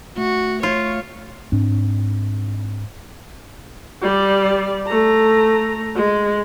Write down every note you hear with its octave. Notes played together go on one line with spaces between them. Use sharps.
A3 F#4
F4 C#5
G#2 C4 D4
G3 D5
A3 A#5
G#3